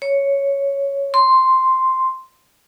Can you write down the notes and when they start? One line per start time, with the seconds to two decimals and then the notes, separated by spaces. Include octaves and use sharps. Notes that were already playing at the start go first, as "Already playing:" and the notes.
0.02 C#5
1.14 C6